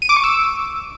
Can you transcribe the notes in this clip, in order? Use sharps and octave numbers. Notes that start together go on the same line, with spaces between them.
D#7
D6
C#6
E6